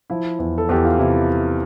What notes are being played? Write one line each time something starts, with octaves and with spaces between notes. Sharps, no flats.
F3 E4
E2
A4
E2 G4
F4
C3 E4